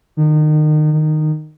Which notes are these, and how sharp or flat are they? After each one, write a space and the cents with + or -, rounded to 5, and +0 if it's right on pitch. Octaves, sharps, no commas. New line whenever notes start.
D#3 -30
D#3 -15